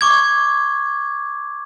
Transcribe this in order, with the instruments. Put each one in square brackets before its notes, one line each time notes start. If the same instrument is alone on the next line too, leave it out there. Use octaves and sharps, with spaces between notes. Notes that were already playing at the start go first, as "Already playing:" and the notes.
[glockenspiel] C#6 D6 G#6